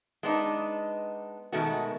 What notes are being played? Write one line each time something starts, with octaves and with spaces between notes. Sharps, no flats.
G#3 B3 D4 D#4
B2 D#3 G#3 A3 B3 F#4